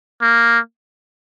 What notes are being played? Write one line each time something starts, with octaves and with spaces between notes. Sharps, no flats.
A#3